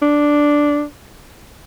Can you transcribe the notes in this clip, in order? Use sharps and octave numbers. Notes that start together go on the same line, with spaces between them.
D4